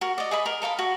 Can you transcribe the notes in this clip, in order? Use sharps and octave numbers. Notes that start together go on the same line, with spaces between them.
F#4 A#4
D5 D#5
G#4 D#5 B5
A#4
A4 A#4 F5 B5
F#4